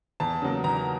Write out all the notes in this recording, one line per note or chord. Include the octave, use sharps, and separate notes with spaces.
E2 A5
C#3 F#3 A#3
E2 A#5